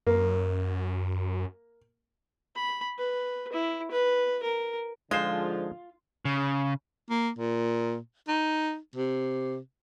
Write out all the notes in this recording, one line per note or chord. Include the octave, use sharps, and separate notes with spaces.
F#2 A#3
B5
B4
E4
B4
A#4
G#2 D3 F3 G#3 F4 C5
C#3
A#3
A#2
D#4
C3